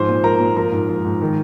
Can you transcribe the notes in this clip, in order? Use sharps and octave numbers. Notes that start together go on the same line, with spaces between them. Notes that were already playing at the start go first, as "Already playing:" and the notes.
Already playing: G#2 F3 C5
A#2
F3 A#4 A#5
A#2
F3 A#4 A#5
G#2
F3
G#2
D#3